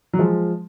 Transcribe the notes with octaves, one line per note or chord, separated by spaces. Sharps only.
F#3
F3 G#3